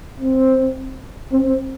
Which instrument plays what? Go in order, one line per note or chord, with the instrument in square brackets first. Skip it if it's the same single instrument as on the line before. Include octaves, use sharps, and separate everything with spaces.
[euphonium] C4
C4